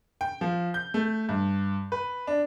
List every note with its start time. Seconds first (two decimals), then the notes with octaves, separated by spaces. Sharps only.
0.21 G5
0.41 F3
0.74 G6
0.94 A3
1.29 G2
1.92 B4
2.27 D4